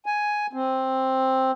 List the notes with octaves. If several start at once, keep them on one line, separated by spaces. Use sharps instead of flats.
G#5
C4